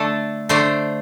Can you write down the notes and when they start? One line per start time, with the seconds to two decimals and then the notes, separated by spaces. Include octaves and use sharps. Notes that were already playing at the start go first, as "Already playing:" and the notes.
Already playing: D3 A3 A4
0.49 D3 A3 C5